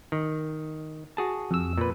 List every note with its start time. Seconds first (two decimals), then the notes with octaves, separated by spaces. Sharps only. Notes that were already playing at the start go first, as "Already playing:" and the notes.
0.12 D#3
1.17 F#4 G#4 A5
1.51 F2 E6
1.77 A#2 B4